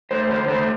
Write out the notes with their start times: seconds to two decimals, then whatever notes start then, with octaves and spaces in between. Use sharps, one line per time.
0.11 A3 C5
0.30 D3 C5
0.48 A3 C5